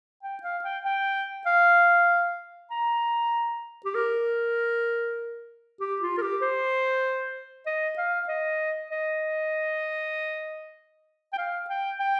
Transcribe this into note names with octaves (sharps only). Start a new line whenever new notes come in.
G5
F5
G5
G5
F5
A#5
G4
A#4
G4
F4
A#4
G4
C5
D#5
F5
D#5
D#5
G5
F5
G5
G5